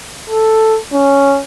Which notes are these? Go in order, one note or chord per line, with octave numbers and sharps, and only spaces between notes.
A4
C#4